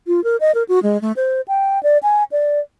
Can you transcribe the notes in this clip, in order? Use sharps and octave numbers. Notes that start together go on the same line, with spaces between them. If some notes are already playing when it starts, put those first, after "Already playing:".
F4
A#4
D#5
A#4
F#4
G#3
A3
C5
G5
D5
G#5
D5